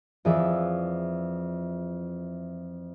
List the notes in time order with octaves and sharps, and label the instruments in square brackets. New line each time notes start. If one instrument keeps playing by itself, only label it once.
[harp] F2 E3 G#4 D5 E5